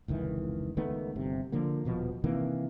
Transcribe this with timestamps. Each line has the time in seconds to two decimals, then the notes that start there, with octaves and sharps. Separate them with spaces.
0.08 F1 C#2 D#3 E3
0.77 C#2 D#3 A3 B3
1.16 G1 C3
1.52 D3 F3 A#3
1.85 D#1 B2 F3
2.24 C3 D#3 E3 A#3